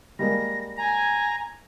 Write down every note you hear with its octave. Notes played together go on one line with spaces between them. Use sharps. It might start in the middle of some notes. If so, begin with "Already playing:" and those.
G3 G#3 A#3 A#6
G#5 A#5